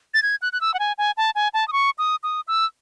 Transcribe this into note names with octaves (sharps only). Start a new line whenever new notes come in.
A6
G#6
F#6
F#6
E6
F#5
G#5
G#5
A5
G#5
A5
D#6
C#6
D#6
D#6
E6